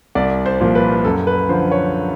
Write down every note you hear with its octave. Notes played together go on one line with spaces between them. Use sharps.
C2 D5
C5
A#2 F3
B4
F#2 A4
B4
D3 F3 C5
C#5